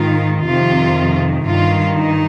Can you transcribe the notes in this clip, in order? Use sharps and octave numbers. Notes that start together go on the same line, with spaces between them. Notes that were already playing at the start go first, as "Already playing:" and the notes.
Already playing: G#2 D#3 F4
F2 C3 D#3 F4
G2 D#3 F4
D#4